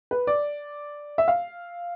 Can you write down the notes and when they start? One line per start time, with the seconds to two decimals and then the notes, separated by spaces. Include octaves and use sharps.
0.11 B4
0.27 D5
1.18 E5
1.28 F5